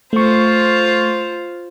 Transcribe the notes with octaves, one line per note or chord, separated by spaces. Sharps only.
A3 F4 C5 C#6